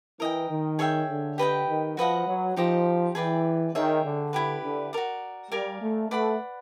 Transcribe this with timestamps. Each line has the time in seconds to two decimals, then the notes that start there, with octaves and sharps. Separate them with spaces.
0.20 E3 A#4 D#5 G5
0.50 D#3
0.79 G#4 C#5 E5 G5
1.09 D3
1.38 G4 B4 D#5 G5
1.68 D#3
1.97 F3 F#4 B4 D#5 F#5
2.27 F#3
2.56 F3 D#4 G4 C5 D#5
3.15 E3 G#4 B4 D5 G5
3.74 D#3 G#4 C#5 E5 G5
4.04 D3
4.33 E4 G4 B4
4.63 D3
4.93 F#4 A#4 D5
5.51 G3 A#4 D5 F5 G#5
5.81 A3
6.10 A3 B4 D5 F#5 B5